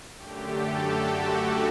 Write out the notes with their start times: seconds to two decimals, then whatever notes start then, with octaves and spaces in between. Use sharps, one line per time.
0.17 F#2 D3 A3 G4
0.46 A4
0.74 G4
1.03 F#4
1.31 G4